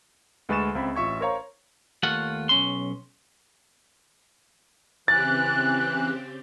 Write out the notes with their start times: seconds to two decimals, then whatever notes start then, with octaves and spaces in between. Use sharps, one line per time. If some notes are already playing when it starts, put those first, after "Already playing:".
0.49 D2 G#3 B4 C#6 A6 E7
0.75 C#2 C4 E5 B5
0.96 A1 F4 E5 C#6 G#6
1.20 A#4 C5 C#5 F5 A#5
2.03 D#2 A3 F4 F#5
2.49 B1 C#4 C6
5.08 C#3 E3 C4 G4 F#6 A6